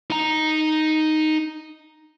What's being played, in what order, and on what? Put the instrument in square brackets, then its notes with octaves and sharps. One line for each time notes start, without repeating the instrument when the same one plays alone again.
[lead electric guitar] D#4 A#5